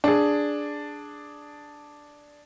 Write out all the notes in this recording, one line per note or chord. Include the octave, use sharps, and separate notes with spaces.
D4 G#4